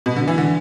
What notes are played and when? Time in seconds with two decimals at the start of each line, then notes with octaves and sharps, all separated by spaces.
0.06 B2
0.16 D3
0.28 E3
0.38 D3